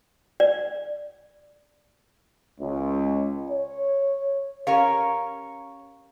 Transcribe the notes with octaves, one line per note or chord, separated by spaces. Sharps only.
D5
C#2
C#5
C#4 G4 A#4 C#5 F5